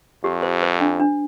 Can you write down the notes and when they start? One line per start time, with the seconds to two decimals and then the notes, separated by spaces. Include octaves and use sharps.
0.24 F2 G4
0.43 C5
0.63 C5
0.81 D4
1.00 D4